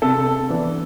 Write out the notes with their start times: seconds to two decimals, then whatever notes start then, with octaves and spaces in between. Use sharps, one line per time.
0.02 C3 A4
0.49 E3 B3 D4